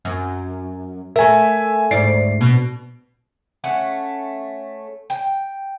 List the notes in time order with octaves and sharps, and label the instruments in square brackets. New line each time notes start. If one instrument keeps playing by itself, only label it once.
[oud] F#2
[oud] A3 A#4 [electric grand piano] E5 G#5
[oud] D2 G#2 D5 [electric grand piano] C7
[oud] B2
[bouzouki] A3 C#4 F#5
G5